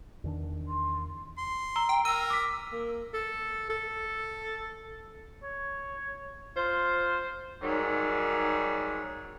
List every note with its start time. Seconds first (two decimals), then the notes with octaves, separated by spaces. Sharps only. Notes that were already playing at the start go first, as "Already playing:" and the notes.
0.24 E2 D#3 D4
0.68 C6
1.38 C6
1.76 A#5 E6 G7
1.89 G5
2.05 A#4 E6 D#7
2.30 D6 B6
2.72 A#3
3.13 A4
3.69 A4
5.43 C#5
6.57 F4 C5
7.62 G#2 D#3 F#3 G3